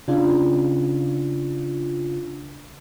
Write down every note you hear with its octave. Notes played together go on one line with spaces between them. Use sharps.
C#3 D4 F4